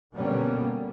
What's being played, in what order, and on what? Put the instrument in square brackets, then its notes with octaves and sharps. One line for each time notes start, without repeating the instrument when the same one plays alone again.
[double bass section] B2 D3 G3 A#3 B3 C#4